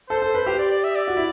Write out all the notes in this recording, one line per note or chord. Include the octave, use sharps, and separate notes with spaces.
A4 C5
A4
B4
G4
D5
D5
E5
D5
F#4
E4